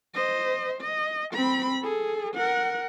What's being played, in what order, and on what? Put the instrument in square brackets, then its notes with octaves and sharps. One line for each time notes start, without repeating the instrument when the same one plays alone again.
[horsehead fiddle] C5 D#5
D#5
C4 B5
G#4 A4
A#4 F#5